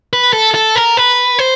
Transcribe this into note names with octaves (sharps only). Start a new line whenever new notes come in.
B4
A4
A4
A#4
B4
C5